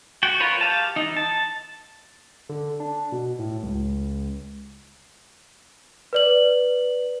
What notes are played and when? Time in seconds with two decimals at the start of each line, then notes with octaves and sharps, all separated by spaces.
0.23 F#4 G5
0.40 F4 A#4 B4 C#5
0.61 G4 F5 A5
0.96 E3 D#4
1.17 A5
2.49 D3
2.80 D4
3.12 B2
3.39 A2
3.63 C#2
6.13 B4 D5 F#7